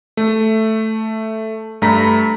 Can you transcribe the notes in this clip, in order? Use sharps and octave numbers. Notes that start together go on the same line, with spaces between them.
A3
G2 A3 A#5 B5 B6